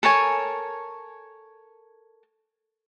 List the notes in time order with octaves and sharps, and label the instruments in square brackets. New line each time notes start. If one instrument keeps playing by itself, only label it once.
[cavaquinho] A4 A#4 C#5 G#5